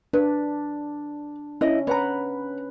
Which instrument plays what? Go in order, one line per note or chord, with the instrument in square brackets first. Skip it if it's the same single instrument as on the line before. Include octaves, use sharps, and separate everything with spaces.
[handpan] D4 [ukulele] B4
[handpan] C#4 [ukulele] E4 D#5
[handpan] B4 [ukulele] C#5 F#5 A#5